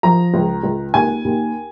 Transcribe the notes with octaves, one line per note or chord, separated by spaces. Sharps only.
F3 A#5
C#2
C#2
D#2 G#5
D#2